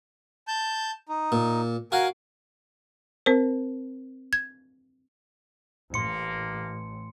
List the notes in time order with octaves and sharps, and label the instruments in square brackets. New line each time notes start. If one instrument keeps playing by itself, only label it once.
[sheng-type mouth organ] A5 G6
D#4
[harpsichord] A#2
[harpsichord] F#4 F5 [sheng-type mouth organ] A#4 G#5
[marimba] C4 A#4 C5
G#6
[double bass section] A1 [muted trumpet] A#3 [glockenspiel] C6 C#7